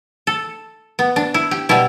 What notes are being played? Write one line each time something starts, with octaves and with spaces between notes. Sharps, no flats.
A4
B3
D4
E4
G4
B2 G3 E4